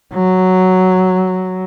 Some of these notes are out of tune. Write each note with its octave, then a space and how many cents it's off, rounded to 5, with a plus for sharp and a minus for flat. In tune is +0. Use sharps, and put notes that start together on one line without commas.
F#3 +5